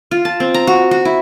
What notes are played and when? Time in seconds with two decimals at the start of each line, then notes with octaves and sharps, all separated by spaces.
0.11 F4
0.25 A5
0.40 C4
0.54 A#5
0.67 F#4
0.91 F#4
1.05 E4